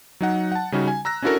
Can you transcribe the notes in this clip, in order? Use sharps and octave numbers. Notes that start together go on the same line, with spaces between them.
F#3 D#4 F#5
F#5 A5
C#3 G3 C#4 D#4 F#4
G#5
A#5 E6 F#6 A#6
C#4 D4 E4 F#4 A4 A#4